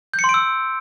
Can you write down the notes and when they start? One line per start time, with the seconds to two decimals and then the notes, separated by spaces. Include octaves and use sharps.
0.14 G6
0.19 C#7
0.24 C6
0.29 D7
0.34 E6